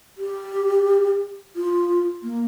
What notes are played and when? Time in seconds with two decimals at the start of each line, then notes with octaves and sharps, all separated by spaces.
0.18 G4
1.56 F4
2.23 A#3